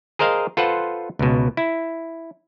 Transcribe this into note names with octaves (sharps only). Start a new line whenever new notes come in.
G#4 A#4 C5 D#5 F5
F4 A4 B4 C5 F#5
C#2 B2
E4